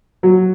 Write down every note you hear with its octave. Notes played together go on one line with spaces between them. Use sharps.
F#3